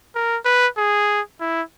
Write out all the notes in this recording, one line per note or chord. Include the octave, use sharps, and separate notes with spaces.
A#4
B4
G#4
E4